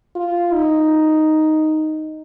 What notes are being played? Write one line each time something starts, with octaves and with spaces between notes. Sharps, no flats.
F4
D#4